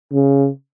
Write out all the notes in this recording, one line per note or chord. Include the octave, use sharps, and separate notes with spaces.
C#3